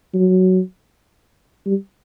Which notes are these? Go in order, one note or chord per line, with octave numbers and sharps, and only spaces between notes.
F#3
G3